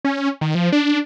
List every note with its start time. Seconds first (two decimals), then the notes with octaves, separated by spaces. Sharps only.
0.05 C#4
0.41 D#3
0.55 F3
0.72 D4